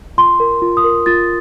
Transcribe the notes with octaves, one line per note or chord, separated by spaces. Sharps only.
F4 C6
A#4
F4
D#6
A#4
F4 A6